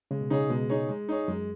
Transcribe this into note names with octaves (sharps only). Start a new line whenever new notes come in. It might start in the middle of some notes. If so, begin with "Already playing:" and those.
C#3 G#3
B2
C#3 D#4 G#4 C#5
B2 G#3
D#4 G#4 C#5
G#3
D#4 G#4 C#5
F#2 G#3